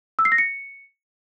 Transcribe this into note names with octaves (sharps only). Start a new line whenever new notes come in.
E6
C7
A#6
C#7